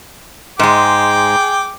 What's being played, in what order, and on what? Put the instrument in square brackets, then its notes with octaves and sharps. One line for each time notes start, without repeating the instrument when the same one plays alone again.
[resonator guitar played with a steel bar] G#2 G#3 [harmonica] G#4 G5 D6